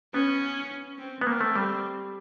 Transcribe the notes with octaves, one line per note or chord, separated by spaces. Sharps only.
B3 C#4
C4
B3
A#3 C4
A3
G3